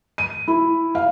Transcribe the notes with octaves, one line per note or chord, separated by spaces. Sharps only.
D#7
E4
F5